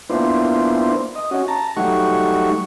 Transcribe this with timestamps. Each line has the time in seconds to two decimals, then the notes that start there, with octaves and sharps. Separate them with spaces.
0.10 A#3 B3 D4 E4 F4 C5
1.15 D#5
1.31 C#4 F#4
1.48 A5 A#5
1.77 F#3 G3 A3 D#4 F#5 C#6